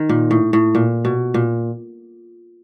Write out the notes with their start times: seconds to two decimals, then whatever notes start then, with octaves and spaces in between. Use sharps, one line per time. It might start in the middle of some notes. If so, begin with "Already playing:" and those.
Already playing: D#3
0.09 A#2
0.31 A2
0.53 A2
0.75 A#2
1.05 B2
1.34 A#2